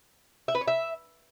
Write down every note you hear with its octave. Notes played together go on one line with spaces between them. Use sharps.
E5
B4
C#5
E5